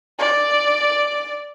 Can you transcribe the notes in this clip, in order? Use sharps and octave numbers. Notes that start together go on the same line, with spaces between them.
D5